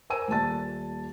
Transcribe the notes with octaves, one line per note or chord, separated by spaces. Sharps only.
A#4 C5 G#5 E6 D#7
D#1 A#2 A5 A6